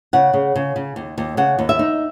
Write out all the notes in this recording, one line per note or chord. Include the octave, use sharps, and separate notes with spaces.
C#3 F#5
C#3
C#3
C#3
D#2
D#2
C#3 F#5
D#2
E5
D#4